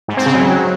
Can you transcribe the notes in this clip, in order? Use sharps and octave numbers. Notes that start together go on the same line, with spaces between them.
G#2
C4
C#3
F#3